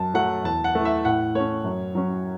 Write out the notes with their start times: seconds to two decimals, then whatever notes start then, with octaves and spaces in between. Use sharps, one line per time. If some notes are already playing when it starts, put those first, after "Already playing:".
Already playing: F#2 A5
0.14 F#3 A3 F#5
0.44 E2 A5
0.64 F#5
0.75 E3 A3
0.85 E5
1.04 A2 F#5
1.35 A3 C#4 C#5
1.64 F#2
1.95 F#3 C#4